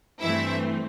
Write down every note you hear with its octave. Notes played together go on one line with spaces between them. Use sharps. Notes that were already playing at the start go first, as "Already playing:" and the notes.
G2 E3 A3 C4 E4 E5